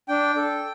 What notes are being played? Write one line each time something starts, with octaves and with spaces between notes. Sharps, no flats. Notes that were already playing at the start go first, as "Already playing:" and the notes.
D4 G5
A4